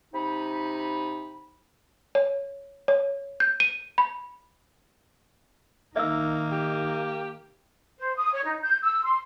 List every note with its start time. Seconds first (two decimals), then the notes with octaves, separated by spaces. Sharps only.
0.14 C3 D#4 B5
2.15 C#5
2.88 C#5
3.40 G6
3.60 D#7
3.98 B5
5.96 D#3 A#3 D#4 E5 E6
6.52 G4
7.99 C5
8.16 D#6
8.33 C#5
8.44 D#4
8.62 G6
8.82 E6
9.04 C6